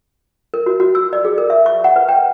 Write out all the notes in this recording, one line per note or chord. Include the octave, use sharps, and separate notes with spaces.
A#4
F#4
F#4
E6
D5
G#4
A#4
E5
C#6
F#5
B4
G5